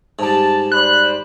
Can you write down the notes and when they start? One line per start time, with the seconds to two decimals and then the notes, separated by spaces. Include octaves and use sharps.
0.19 G#2 G3 A5
0.72 C5 D5 B5 F#6